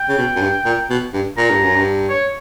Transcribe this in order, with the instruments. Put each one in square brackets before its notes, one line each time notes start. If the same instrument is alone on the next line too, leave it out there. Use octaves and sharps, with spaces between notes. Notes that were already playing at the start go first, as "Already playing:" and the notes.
Already playing: [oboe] G5
[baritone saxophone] C#3
B2
F#2
G2
A#2
B2
G2
[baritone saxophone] A#2 [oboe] A#5
[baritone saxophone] G2
F#2
G2
[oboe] C#5